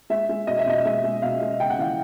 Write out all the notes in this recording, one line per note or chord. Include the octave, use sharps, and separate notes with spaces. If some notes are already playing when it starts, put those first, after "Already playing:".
G#3 E5
G#3
B2 D#5
E5
B2 D#5
G#3 E5
G#3
B2 F5
G#3
C#3 G5
F#5
E3 F5